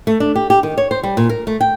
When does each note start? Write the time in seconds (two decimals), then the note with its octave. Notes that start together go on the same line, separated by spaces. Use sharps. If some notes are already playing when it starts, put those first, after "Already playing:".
0.07 A3
0.20 D4
0.36 G4
0.50 G4
0.63 D#3
0.78 C#5
0.91 C5
1.03 G3
1.17 A#2
1.29 A#4
1.47 A3
1.61 G5